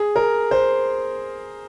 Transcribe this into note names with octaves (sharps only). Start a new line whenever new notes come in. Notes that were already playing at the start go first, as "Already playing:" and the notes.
Already playing: G#4
A#4
C5